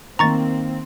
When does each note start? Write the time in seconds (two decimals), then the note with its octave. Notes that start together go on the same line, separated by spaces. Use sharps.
0.19 D#3 A#3 C4 A#5 C#6 A6